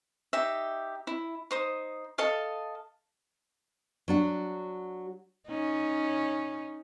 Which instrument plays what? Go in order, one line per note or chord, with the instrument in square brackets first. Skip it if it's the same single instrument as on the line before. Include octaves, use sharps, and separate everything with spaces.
[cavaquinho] D#4 G4 E5
E4
D#4 C5 D#6
A4 D#5 F5 A5
[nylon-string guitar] F#3 D4 F#4
[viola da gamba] C#4 D#4